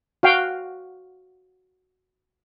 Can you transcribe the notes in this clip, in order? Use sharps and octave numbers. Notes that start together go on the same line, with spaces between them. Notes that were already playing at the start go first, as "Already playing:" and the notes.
F#4 F5 G5